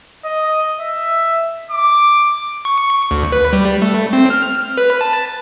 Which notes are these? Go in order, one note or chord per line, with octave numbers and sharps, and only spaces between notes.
D#5
E5
D6
C#6
D2
B4
G3
A3
C4
F6
B4
A5